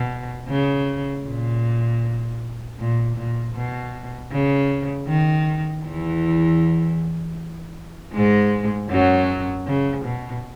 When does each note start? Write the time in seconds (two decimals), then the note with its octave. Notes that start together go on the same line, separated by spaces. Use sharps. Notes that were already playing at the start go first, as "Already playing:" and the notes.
Already playing: B2
0.48 C#3
1.26 A#2
2.79 A#2
3.16 A#2
3.54 B2
4.32 C#3
5.07 D#3
5.84 E2 E3
8.13 G#2 G#3
8.90 F#2 F#3
9.66 C#3
10.04 B2